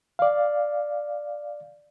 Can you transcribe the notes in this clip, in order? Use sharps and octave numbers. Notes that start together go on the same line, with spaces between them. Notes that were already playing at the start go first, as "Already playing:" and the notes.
D5 F5